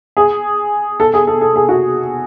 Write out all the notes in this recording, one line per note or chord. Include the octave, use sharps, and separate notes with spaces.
G#4
A4
G#4
A4
A4
G#4
F#4